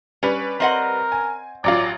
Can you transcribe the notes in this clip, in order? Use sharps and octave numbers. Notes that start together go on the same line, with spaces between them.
G3 C#4 B4
C4 A#4 D#5 F#5
G#5
A1 F#3 F4 D5